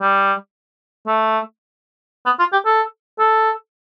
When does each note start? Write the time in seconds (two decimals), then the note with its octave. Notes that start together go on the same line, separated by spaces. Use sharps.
0.01 G3
1.07 A3
2.26 B3
2.39 F4
2.53 G4
2.66 A4
3.19 A4